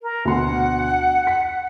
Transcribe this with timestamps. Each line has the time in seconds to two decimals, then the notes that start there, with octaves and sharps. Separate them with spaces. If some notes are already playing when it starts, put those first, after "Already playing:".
0.02 A#4
0.25 D2 B2 F#5 C6
1.27 B6